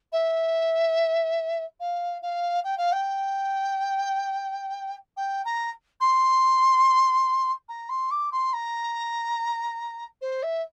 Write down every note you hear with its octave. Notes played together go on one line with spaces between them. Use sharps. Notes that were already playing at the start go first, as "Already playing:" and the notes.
E5
F5
F5
G5
F5
G5
G5
A#5
C6
A#5
C6
D6
C6
A#5
C5
E5